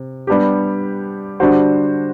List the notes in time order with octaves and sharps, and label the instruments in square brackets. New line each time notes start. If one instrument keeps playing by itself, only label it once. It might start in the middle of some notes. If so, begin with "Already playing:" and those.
Already playing: [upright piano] C3
G3 B3 D4 G4
D3 G3 D4 F#4 C5